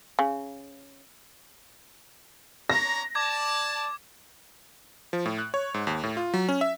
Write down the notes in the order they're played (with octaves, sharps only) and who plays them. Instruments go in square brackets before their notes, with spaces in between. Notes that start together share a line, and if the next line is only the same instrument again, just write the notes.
[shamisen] C#3
[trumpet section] D4 C#5 A#5 [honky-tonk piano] A#6
[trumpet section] D5 A5 [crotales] D6 G#6
[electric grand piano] F3
A2
F#6
C#5
G#2
D#2
A2
F4
F#3
C#4
E5